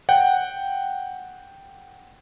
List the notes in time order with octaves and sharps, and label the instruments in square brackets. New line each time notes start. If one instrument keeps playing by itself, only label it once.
[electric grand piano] F#5 G5